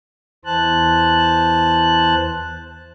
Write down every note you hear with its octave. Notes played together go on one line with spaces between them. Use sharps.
E2 E3 C5 A5 F#6